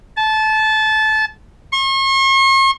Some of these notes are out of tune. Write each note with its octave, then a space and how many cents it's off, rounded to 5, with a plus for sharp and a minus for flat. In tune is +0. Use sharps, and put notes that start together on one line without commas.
A5 -20
C#6 -45